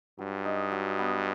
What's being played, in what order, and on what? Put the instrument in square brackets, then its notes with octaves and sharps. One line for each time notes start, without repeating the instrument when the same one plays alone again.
[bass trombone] G2 [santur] F#3
[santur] D#4
F#3
B3